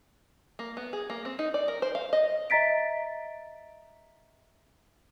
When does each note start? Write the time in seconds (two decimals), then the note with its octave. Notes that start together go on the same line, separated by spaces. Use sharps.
0.59 A#3
0.77 B3
0.93 G#4
1.10 A#3
1.25 C4
1.39 D#4
1.54 D5
1.68 A#4
1.82 C5
1.95 F5
2.13 D#5
2.50 D#5 E5 A#5 A6 B6 D7